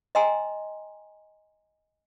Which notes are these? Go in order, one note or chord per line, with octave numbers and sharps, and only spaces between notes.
D#5 G5 G#5 A#5 C6 E6